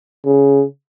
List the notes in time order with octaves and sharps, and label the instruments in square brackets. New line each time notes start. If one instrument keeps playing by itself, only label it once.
[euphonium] C#3